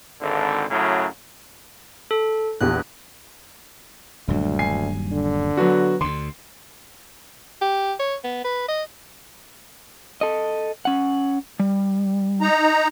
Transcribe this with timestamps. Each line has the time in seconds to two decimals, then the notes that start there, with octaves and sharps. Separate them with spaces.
0.20 G#1 D3
0.70 F#2 A2 C#3 F#3
2.11 A4
2.61 A#1 E2 G4 F#6
4.28 D#1 D2 G2 F#3
4.59 G#5 C7
5.12 D3
5.57 F#3 B3 F#4
6.01 D2 D3 C6
7.62 G4
7.99 C#5
8.24 B3
8.45 B4
8.69 D#5
10.21 A4 D#5
10.85 C#4 F#5
11.60 G3
12.41 D#4 A#5